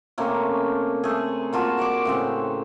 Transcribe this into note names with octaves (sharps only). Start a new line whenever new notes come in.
C3 A3 A#3 C#4
A3 G#4
A#3 F4 F#4 A5
F#4 D5 C#6 D6
A2 C#3 C4